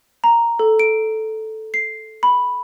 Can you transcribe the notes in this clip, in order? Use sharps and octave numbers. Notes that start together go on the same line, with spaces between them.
A#5
A4
D7
C7
B5